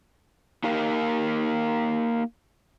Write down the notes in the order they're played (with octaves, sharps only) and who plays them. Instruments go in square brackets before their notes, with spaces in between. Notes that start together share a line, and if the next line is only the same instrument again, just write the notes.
[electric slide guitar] A#3 D#4 G4 A#4 F5